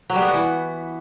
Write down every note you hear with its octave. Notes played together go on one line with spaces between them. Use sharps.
F#3
G3
B3
F#4
E3